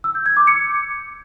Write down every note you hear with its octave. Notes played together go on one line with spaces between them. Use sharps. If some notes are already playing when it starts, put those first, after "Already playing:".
E6
G6
G#6
D6
C#7